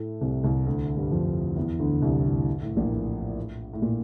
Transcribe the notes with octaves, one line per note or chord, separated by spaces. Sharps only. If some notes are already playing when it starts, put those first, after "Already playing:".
Already playing: A2 A3
C2 C3
C2 C3
D2 D3
G2 G3
F2 F3
E2 E3
D2 D3
C2 C3
A2
A2
A#1 A#2
A2
A2
A#2